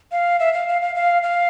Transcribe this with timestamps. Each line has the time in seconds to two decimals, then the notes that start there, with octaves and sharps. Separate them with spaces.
0.12 F5
0.40 E5
0.54 F5
0.68 F5
0.82 F5
0.95 F5
1.23 F5